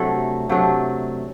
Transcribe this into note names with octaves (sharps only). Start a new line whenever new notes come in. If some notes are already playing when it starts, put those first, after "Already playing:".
Already playing: C3 F#3 A3 D4 A4
C3 F#3 A3 D4